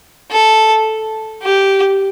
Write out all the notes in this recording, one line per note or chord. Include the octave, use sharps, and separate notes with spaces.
A4
G4